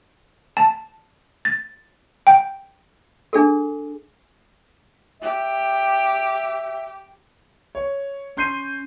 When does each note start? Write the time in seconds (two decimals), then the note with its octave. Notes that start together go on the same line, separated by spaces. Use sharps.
0.57 A5
1.45 A6
2.27 G5
3.33 D4 G#4 A4
5.22 G4 E5
7.75 C#5
8.37 C#4 C6 G6 C7 D#7